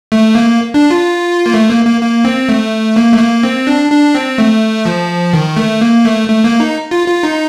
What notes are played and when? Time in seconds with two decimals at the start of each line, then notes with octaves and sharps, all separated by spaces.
0.12 A3
0.35 A#3
0.74 D4
0.91 F4
1.46 A#3
1.54 A3
1.69 A#3
1.85 A#3
2.01 A#3
2.25 C4
2.49 A3
2.96 A#3
3.12 A3
3.19 A#3
3.43 C4
3.67 D4
3.91 D4
4.15 C4
4.38 A3
4.85 F3
5.33 D#3
5.57 A3
5.81 A#3
6.05 A3
6.29 A3
6.44 A#3
6.60 D#4
6.91 F4
7.08 F4
7.23 D#4